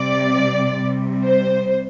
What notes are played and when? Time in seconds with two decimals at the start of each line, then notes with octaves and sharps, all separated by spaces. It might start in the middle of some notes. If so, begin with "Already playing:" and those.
Already playing: C3 G3 D5
0.77 C3 G3
1.23 C5